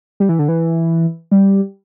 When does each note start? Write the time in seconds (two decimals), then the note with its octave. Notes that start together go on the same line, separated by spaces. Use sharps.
0.20 G3
0.29 E3
0.39 D3
0.48 E3
1.31 G3